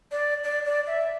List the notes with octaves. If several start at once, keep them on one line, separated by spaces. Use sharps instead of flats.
D5
D5
D5
E5